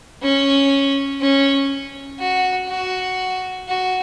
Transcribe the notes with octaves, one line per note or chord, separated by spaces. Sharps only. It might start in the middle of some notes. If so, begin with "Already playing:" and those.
C#4
C#4
F#4
F#4
F#4